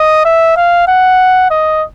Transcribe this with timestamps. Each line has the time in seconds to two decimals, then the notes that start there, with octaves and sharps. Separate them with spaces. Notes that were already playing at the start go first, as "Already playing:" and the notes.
Already playing: D#5
0.25 E5
0.57 F5
0.88 F#5
1.51 D#5